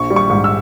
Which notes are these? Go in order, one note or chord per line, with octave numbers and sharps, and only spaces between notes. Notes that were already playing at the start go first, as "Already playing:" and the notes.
Already playing: A#1 C#6
G3
C#6
G#2
E6